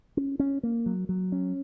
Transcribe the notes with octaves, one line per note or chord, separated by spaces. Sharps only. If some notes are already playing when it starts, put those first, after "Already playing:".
C#4
C#4
A#3
F#3
F#3
C#4